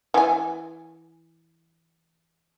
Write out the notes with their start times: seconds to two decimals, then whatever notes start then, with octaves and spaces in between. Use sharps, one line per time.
0.14 E3 G#5